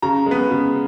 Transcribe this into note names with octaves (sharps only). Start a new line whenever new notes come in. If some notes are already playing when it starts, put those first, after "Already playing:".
C#3 A#5
G#3 B3
C#3